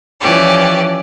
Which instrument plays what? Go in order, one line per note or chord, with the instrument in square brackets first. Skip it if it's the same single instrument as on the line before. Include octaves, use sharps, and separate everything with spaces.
[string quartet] E3 F3 C#4 G4 D5